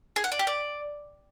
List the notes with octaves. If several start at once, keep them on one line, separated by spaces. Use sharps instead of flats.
G#4
F#5
D5
G4
D5